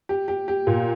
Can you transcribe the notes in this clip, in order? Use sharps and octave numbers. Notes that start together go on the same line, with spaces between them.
G4
G4
G4
A#2